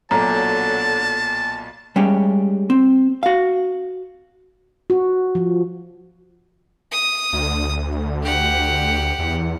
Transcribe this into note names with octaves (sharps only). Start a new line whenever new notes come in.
B1 A#2 D3 F#3 A5 A#5
G3 G#3 C#4 G4
C4
F#4 F5
F#4
F3
D#6
D2
G4 F#5
E2